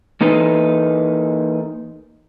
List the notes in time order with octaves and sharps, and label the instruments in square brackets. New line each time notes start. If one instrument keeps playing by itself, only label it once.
[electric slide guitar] E3 A#3 D#4 A4 B4 C5